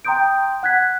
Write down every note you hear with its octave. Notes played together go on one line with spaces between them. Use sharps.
G5 A#5 C6 D#6 G6 D7
F#5 F#6 G#6 B6